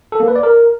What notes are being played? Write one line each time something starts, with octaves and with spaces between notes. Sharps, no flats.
A4
A#3
B4
D5
A#4